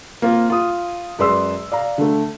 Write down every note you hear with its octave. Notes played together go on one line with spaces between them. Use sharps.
A#3 C4 F4
F4 D#6
F#2 G#3 B4 D5 C6 E6
D5 F5 A#5
D3 A3